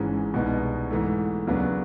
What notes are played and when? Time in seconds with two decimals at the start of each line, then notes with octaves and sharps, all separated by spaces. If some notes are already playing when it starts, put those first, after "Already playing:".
Already playing: G#1 G#2 E3 G#3 C#4
0.34 C2 B2 G#3 B3 D#4
0.91 G#2 E3 A3
1.47 D#2 C#3 F#3 B3 D4